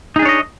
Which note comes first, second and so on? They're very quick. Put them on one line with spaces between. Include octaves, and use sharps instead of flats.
D#4 G#4 D4 C#5 D#5